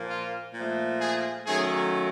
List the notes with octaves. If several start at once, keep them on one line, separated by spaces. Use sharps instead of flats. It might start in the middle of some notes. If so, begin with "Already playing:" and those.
Already playing: A#2 F3 A#3
F4
A#2 F3 A3
G#4
D#3 F#3 A3 C#4 G#4